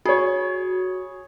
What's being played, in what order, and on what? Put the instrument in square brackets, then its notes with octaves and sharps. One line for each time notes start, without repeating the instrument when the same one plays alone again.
[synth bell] F#4 [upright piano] G#4 C#5